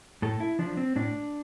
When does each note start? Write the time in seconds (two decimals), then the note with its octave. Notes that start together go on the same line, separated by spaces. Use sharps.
0.22 A2 A4
0.40 E4
0.59 F3 D4
0.77 C4
0.96 A2 D4